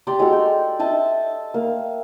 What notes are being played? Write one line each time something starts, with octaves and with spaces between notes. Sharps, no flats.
G4 D5 A#5 C6
G#3 F#4 A4
G5
D#5 E5 A5 C6
A#3